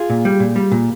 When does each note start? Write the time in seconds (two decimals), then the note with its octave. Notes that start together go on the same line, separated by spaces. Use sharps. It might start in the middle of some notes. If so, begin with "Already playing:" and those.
Already playing: F4 G#4
0.10 A#2
0.25 G3
0.40 A#2
0.56 G3
0.72 A#2